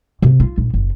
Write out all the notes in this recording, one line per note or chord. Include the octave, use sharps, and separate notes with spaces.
C3
F4
A#1
F#1